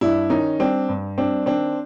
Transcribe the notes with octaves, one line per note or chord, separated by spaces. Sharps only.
G2 D4 E4
D#3 C#4 D#4
G3 C4 D4
G2
G3 C4 D4
D#3 C4 D4